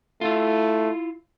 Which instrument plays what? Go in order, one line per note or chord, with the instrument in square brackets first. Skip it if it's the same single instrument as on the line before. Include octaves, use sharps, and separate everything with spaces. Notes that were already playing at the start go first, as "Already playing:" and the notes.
[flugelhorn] A3 [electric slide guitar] E4 F4